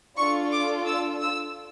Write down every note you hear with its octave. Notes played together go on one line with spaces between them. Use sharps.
D4 F4 A4 C#6
D6
E6
E6